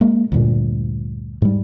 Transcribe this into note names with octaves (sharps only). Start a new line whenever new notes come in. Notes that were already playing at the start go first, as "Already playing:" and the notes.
G#3 A#3
D2 G2 A#2
G#2 G3